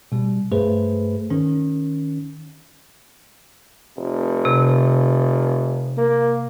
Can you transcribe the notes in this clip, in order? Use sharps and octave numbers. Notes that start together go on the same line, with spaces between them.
B2 G3
G2 A3 G#4 B4 C5
D#3 C#4
F1
C3
A#3